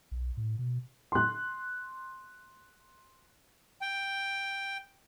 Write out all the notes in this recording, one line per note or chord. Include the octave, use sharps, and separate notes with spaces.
B1
A2
B2
C6 F#6
G5